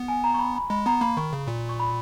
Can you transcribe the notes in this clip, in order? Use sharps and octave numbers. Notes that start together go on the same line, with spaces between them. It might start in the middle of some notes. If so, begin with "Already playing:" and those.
Already playing: B3
G#5
A#5
C#6
B5
B5
G#3 B5
B3 A#5
A#3 B5
D#3 C#6
C#3
A#2
C#6
B5